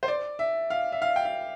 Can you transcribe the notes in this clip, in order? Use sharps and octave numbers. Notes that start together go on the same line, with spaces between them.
C5
D5
E5
F5
E5
F5
G5
F5